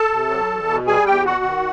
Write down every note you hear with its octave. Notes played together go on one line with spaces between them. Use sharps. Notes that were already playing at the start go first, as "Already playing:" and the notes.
Already playing: A4 A5
C3
F#3
E2
B2
G3 G#4 G#5
E2 G4 G5
B2 F#4 F#5
D#3